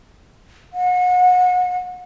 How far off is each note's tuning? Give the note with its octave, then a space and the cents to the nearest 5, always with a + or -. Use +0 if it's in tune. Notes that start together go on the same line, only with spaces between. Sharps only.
F#5 -35